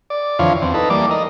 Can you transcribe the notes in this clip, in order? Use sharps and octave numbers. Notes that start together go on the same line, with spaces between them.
D5
F2 D3 E3 F3 C#5 F5
E2 C4
D#4 A4 B4
E3 G3 A#3 D5 D6
A#4 D#5